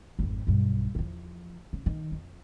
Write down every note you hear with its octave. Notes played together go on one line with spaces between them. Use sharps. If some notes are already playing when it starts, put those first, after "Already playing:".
G#1 F2
B1 G2
E2 F3
C#3
D#3
F2